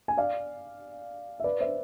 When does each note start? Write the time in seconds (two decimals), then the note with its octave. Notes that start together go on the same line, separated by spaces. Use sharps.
0.08 G#5
0.17 D5 F5
1.40 E5
1.44 B4 D5
1.61 C5 E5